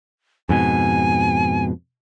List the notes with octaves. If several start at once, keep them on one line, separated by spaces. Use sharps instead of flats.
F2 G#2 B2 G#5